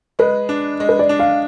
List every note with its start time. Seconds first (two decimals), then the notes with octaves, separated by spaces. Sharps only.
0.19 G#3 B4
0.49 D4
0.80 G#3
0.89 B4
0.99 D5
1.09 D4
1.19 F5